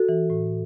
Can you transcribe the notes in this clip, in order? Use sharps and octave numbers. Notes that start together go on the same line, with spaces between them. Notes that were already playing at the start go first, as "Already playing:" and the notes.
Already playing: F#4 A4
E3
A2